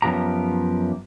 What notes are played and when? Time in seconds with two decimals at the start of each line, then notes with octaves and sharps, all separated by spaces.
0.02 F#2 F3 B3 G4 A#5